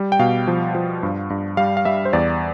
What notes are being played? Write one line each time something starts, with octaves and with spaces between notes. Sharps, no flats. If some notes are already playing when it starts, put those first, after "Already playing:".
Already playing: G3
G5
B2 F5
F3
F3
G2
G2
G3 F5
F5
G3 E5
C5
E2 D5